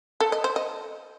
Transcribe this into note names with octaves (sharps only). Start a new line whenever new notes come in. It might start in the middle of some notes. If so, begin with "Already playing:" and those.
A4
D#5
C5
D#5